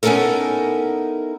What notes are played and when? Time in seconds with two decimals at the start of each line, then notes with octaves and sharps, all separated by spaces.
0.03 B3 C#4 D#4 E4 A4 A#4